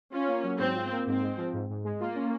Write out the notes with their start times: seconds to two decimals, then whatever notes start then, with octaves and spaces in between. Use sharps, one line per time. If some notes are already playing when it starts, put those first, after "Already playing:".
0.12 C#4 F4
0.28 A#3
0.44 F#3
0.59 G#2 C4
0.75 F4
0.91 A#3
1.06 G#2 C4
1.22 G#3
1.37 F3
1.53 G#2
1.69 G#2
1.84 G#3
2.00 A#3 F4
2.15 C#4